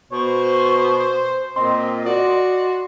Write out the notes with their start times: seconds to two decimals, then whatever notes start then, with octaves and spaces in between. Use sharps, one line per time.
0.12 B2 C5 C#6
1.56 A#2 C4 D#5 C6
2.06 F#4 D5